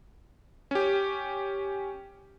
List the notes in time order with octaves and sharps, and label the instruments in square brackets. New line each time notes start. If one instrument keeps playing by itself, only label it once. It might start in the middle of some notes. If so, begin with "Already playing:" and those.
[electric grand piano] C#4 G4